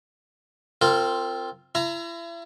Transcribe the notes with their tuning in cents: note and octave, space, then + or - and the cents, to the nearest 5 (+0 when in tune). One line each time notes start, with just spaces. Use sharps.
C4 +0 F4 +0 A#4 -35
E4 +40 A#5 +0